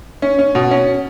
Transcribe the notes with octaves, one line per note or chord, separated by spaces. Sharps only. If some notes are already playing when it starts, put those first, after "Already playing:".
C#4
C#4
B2
C#4